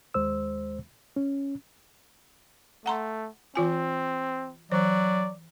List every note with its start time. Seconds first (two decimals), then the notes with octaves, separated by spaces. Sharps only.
0.14 D#2 G#3 C5 E6
1.16 C#4
2.86 A3 F#5 A#5 C6
3.55 E3 C4 F4 G#5
4.72 E3 F#3 C5 D5